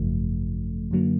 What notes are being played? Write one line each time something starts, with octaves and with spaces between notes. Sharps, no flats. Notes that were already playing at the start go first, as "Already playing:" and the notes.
Already playing: G#1 F#2 C#3 F3 A3
F#2 D3 F#3 A#3